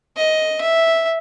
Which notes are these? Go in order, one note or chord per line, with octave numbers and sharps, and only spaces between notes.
D#5
E5